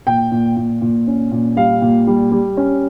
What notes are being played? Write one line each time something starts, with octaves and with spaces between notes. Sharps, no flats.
A#2 G5
A#2
A#2
A#2
C#4
A#2
G3 F5
A#2
G3
G3
C#4